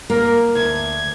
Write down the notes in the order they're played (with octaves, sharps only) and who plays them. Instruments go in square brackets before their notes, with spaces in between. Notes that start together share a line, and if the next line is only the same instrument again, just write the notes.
[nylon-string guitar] A#3 [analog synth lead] A#4
[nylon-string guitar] D2 [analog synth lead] G#6